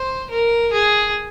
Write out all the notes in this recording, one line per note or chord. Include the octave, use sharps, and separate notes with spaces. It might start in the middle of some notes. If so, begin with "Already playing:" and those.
Already playing: C5
A#4
G#4